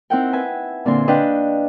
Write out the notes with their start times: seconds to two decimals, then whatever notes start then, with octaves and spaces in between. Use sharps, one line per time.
0.10 C4 D#4 E4 A#4 F#5 G5
0.33 B4 E5 G#5
0.85 A#2 D3 A#3 C4 G#5 C6
1.08 D4 B4 D#5 F5 G5